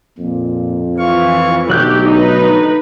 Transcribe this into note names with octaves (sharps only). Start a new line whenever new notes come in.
F2 A#2
E3 F4 F5 C#6
B1 D3 F#3 A3 G4 F#6 G6
D#4 B4